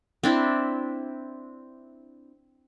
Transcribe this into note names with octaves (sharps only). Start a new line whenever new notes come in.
C4 D4 E4